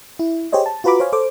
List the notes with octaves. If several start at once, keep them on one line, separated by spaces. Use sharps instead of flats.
E4
G4 G#4 C5 C#5 D#5
A5
F4 F#4 B4 A#5 B5 D6
C5 C#5 F5 G#5
A4 C5 D6